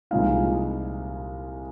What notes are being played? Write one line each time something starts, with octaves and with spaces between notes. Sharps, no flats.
C2 A#2 F3 G#3 D#4 F5